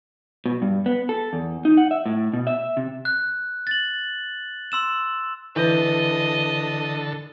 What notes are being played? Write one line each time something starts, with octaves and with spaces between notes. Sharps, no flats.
B2
G2
B3
A4
E2
D#4
F#5
E5
A2
B2
E5
C3
F#6
A6 F#7
C6 E6 E7
D3 E3 A4 B4 D#5 G6